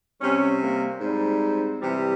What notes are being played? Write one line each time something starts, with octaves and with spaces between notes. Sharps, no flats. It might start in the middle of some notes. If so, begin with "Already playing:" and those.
C3 G3 C#4
A#3
G#2 G3 C4
C3 E3 G3